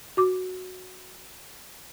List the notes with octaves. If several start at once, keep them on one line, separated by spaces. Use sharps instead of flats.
F#4 D6